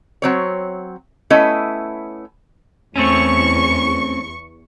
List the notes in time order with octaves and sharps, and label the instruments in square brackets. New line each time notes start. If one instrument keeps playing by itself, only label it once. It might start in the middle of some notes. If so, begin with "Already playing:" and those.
[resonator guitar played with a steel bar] F#3 C4 C#5
A3 B3 C#4 E4 D#5
[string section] E2 C#6 [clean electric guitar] A3 C4 C#4